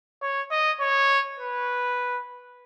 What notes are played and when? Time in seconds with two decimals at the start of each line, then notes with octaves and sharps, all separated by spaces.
0.22 C#5
0.51 D#5
0.80 C#5
1.39 B4